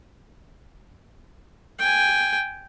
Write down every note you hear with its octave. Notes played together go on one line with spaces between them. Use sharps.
G5 G#5